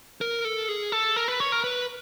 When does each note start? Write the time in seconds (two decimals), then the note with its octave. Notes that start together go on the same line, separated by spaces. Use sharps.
0.21 A#4
0.45 A4
0.69 G#4
0.92 A4
1.16 A#4
1.28 B4
1.40 C#5
1.52 A#4
1.64 B4